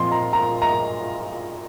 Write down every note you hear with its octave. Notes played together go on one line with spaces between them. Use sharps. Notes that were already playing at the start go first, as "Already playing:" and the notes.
Already playing: A#2 F3 C4 C6
A#5
A#5
A#5